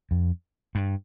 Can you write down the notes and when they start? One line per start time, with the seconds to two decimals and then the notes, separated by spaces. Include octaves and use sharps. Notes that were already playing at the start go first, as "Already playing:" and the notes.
0.11 F2
0.75 G2